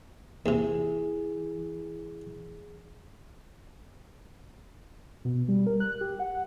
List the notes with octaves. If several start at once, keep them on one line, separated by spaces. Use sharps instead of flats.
D#2 C3 E3 G#4
B2
G3
A#4
F#6
G4
F#5